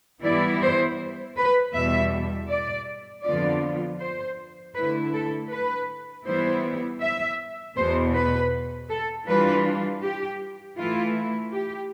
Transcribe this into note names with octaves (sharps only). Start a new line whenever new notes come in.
E3 G3 B3 E4 D5
C5
B4
E2 B2 G3 E5
D5
F2 D3 F3 B3 F4 D5
C5
D3 A3 E4 B4
A4
B4
E3 G3 B3 E4 C5
E5
E2 B2 B3 C5
B4
A4
E3 G3 D4 F4 B4
G4
E3 A3 E4 F4
G4